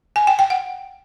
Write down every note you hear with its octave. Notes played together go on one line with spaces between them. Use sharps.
G#5
G5
G5
F#5